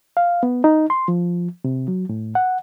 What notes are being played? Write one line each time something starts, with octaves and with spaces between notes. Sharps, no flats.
F5
B3
D#4
C6
F3
C3
F#3
A2
F#5